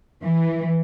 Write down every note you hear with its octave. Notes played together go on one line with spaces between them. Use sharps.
E3